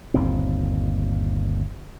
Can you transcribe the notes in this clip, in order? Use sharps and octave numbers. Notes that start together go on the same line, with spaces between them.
G1 D#2 A#2 C4